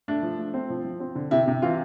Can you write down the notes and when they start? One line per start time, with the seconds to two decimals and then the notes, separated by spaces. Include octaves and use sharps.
0.08 A3 D4
0.23 F3
0.38 A3
0.54 C4
0.70 F3
0.85 F3
1.00 C4
1.15 D3
1.31 C3 E4
1.48 C3
1.62 E3 F4